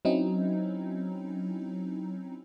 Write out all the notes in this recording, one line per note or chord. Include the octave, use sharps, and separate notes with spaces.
F#3 C4 C#4 D#4 E4